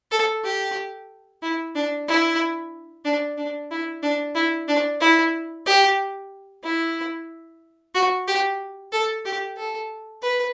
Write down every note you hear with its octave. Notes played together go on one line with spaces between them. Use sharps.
A4
G4
E4
D4
E4
D4
D4
E4
D4
E4
D4
E4
G4
E4
F#4
G4
A4
G4
A4
B4